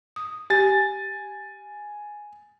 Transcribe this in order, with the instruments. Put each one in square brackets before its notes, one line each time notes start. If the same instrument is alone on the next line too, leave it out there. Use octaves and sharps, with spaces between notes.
[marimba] D#6
[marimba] G4 [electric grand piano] G#5 A6